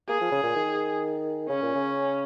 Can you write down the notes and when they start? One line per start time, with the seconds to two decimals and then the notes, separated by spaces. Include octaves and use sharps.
0.09 A#3 G#4
0.21 F3
0.32 C#3
0.43 A#2
0.56 D#3
1.49 C#3 C#4
1.62 A#2
1.75 C#3